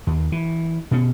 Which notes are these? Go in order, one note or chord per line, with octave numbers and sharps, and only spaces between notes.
D#2
E3
B2 C#4